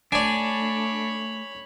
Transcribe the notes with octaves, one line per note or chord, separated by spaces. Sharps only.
A3 D4 C#5 D5 G#5 B5